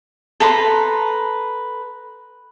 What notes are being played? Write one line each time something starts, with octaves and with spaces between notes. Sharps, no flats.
A4 B4 A#5 C6